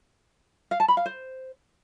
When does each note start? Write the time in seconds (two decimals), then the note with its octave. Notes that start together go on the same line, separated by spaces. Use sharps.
0.71 F5
0.80 A5
0.88 B5
0.97 F5
1.06 C5